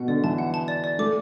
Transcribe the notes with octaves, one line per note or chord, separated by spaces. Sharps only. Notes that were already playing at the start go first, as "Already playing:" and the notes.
Already playing: B2 F#5
D3 D5
E3 A5
F#5
A5
D5
D5
A3 D6